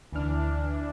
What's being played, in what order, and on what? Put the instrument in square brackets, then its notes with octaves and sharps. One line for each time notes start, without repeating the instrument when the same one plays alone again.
[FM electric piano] D2 F6 [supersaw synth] E3 D4